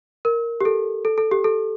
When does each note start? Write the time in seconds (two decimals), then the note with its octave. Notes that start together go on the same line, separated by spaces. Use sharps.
0.25 A#4
0.60 G4
0.65 A4
1.05 A4
1.18 A4
1.32 G4
1.44 A4